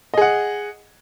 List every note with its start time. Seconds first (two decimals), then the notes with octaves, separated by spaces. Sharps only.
0.14 D#5
0.17 G#4
0.21 F#5